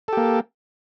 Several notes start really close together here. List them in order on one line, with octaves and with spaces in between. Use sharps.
A4 G4 A#3